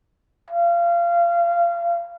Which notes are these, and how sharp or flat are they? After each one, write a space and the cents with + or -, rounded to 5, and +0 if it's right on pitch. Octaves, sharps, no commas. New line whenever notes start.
F5 -25